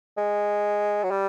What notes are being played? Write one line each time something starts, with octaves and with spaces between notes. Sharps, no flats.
G#3
F#3
G3